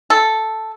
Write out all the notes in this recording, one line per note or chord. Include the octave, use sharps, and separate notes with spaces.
A4